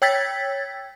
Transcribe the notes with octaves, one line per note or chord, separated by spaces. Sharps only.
C#5 G5 E6 G#6 A6 B6